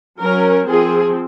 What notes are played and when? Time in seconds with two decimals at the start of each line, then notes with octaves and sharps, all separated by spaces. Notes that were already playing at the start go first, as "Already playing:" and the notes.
0.20 F#3 C#4 A#4
0.68 F3 C4 G#4